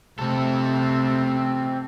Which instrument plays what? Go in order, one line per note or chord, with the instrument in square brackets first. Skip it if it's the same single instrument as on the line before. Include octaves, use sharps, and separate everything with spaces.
[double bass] C3 A3 [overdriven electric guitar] C4 A4